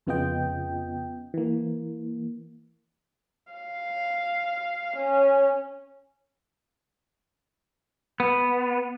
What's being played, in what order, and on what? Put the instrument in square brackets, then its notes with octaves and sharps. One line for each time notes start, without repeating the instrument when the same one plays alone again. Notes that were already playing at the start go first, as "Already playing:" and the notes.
[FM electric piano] F2 C#3 B3 F4 D#5 G5
E3 A#3
[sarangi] F5
C#4
[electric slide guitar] B3